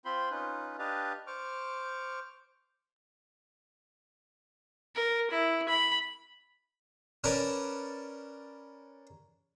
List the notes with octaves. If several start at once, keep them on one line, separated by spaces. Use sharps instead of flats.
C4 F4 C5 B5 C6
C#4 D#4 F4 B4
D4 G4 B4 D#5 F5 A5
C5 C#6 D6 F6
A#4
E4
B5
C#4 A#4 B4 D5 A5